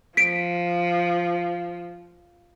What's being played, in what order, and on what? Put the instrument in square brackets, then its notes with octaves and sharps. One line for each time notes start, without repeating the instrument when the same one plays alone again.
[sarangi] F3 [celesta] B6 D7